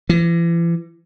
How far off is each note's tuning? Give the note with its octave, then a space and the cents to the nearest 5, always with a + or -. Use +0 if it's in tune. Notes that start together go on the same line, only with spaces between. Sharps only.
E3 +40